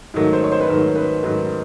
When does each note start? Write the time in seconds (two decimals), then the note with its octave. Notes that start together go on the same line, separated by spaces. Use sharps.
0.14 G#2 D#3 F#3 A3
0.33 C5
0.44 C#5
0.52 C5
0.61 B4
0.68 G#2 D#3 F#3 A3 A#4
0.96 B4
1.23 G#2 D#3 F#3 A3 B4